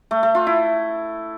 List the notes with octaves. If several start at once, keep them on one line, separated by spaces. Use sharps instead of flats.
A3
A3
F4
E4